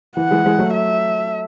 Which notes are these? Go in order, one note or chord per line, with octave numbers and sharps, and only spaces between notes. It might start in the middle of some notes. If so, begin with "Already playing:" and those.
E3 F#5
E3 G#3
E3 G#3
F#3 A3
E5